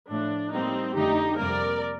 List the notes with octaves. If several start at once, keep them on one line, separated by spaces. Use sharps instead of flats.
A2 F3 A3 D4
A2 G3 A#3 C4 D#4
F2 D3 A3 D#4 G4
F2 C3 G3 A#3 A#4 D5